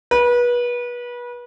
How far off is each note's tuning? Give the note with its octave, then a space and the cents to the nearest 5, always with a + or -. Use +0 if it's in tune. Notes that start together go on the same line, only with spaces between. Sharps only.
B4 -30